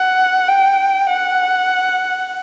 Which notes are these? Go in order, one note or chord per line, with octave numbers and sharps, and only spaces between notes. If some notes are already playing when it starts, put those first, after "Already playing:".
Already playing: F#5
G5
F#5